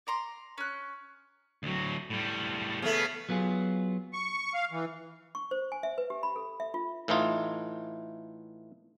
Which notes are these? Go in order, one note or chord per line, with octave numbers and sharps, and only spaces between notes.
D5 A#5 C6
C#4 F#6
D2 F#3
A2 G3
C#3 A3 B3
F#3 B3 F4 G#4
C#6
F5
E3
C#6
C5
G#5
E5
B4
G4
B5
A4
E5
F4
A2 E3 A3 D#4 F4